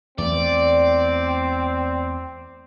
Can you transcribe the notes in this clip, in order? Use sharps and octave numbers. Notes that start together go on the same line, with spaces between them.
E2 A3 C4 D5